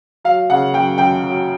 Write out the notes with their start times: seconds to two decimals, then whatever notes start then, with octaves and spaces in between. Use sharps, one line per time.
0.24 F#3 F5
0.50 C#3 F#5
0.74 F#2 G5
0.98 F#2 G5
1.23 F#3